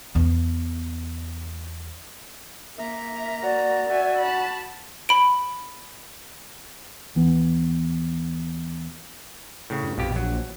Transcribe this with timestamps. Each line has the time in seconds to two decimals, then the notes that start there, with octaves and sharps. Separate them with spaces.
0.15 E2 B3
2.78 A#3 E5 A#5
3.43 F#4 D5
3.89 F#4 E5 G#5
4.19 A5 B5
5.09 B5 D7
7.15 D#2 E3 B3
9.70 A2 C#3
9.83 G2
9.98 A#1 F2 B2 G4
10.16 F#3